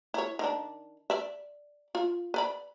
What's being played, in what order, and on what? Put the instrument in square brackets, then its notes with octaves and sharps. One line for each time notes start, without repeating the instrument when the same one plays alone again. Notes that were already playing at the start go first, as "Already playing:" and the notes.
[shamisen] E4 C#5
D#3 D4
D5 E5
F4
B4 D5 B5